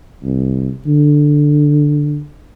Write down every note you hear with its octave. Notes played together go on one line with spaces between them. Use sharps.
C2
D3